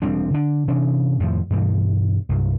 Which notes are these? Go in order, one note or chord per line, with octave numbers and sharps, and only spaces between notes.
E1 G3 C4 D4
D3 D4
C3 E3 C#4 D4
F2 A2 D#3 F3
G2 B2 E3 G3
C2 G2 F#3